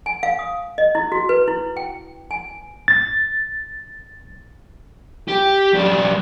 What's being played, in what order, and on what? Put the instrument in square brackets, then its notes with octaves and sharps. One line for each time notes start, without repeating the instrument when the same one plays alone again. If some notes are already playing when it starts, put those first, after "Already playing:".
[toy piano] G#5
F5
D#6
D#5
E4
F#4
B4
E4
G5
G#5
[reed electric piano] A6
[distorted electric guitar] G4
F#2 D4